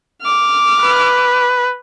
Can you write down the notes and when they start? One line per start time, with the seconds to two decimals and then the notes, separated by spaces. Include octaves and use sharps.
0.22 D6 F6
0.82 B4